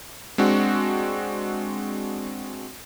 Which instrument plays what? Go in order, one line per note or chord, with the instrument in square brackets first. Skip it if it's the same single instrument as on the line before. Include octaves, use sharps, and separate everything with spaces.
[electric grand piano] G#3 C4 D4 F#4